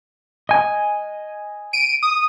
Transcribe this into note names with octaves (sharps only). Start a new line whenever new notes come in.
D#5 G#5
D7 D#7
D#6